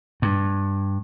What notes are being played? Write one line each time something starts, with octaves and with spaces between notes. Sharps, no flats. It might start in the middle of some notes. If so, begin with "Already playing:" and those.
G2